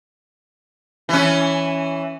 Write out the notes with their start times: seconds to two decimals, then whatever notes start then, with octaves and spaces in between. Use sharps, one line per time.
1.09 E3 C#4